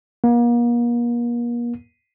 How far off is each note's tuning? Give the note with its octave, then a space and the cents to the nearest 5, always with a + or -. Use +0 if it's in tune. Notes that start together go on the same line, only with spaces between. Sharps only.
A#3 +40